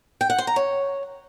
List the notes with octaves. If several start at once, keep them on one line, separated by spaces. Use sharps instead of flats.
G5
F#5
C5
A#5
C#5